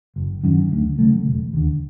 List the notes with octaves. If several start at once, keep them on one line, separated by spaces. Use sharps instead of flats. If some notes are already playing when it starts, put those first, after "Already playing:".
F#1
F#2 D#3
D2
C#3 F#3 A3
E1
D#2 D3